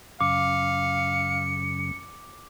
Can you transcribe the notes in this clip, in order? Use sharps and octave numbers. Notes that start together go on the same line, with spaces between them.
F#2 C#3 F5 D6 C#7